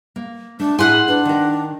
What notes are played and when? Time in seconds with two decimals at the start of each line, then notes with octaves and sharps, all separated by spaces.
0.16 A#3
0.60 A3 D4
0.79 A2 E4 G#4 F#5 G#5 C6
1.08 D4 B4
1.25 D#3 A#4